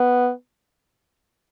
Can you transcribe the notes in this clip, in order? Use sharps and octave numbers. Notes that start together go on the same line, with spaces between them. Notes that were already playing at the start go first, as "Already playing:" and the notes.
Already playing: B3